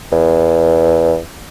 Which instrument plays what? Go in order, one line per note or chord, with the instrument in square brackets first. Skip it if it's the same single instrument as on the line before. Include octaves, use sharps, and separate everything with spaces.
[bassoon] E2